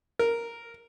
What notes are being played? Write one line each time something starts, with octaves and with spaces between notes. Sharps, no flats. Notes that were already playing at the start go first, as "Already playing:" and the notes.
A#4